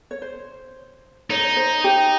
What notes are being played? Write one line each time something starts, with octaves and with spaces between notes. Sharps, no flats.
C#5
C5
D#4 C#5
C5
C#5
C5
G4